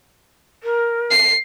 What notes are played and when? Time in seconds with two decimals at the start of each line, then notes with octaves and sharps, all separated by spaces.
0.63 A#4
1.11 C7